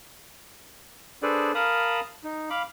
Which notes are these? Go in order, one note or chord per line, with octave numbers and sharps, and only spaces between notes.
D4 G#4 A4 B4 C5 D5
A#4 F5 A5 B5 D#6
D#4
F5 B5 D6